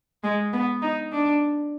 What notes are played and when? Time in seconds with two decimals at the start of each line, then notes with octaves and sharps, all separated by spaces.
0.24 G#3
0.53 B3
0.82 D#4
1.12 D4